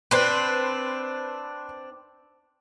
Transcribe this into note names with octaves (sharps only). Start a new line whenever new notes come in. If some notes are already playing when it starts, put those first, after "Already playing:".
C4 D4 B4 C5